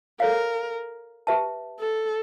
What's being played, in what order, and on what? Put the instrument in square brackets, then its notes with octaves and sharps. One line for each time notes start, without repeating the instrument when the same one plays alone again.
[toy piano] A4 C#5 F5 [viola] A#4
[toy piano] G4 B4 E5 A5
[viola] A4